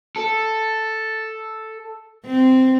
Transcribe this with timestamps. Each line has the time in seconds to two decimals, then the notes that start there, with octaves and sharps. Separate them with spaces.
0.16 A4
2.26 C4